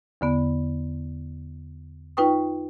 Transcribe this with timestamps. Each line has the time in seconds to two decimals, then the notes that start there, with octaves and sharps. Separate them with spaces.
0.21 E2 D3 B3
2.17 D#4 F4 B4 G5 C#6 D#6